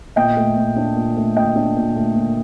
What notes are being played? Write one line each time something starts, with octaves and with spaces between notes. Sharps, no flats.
A#2 D#5 G5
A3
A#2
D4
A#2
A3
A#2 D#5 G5
D4
A#2
A3
A#2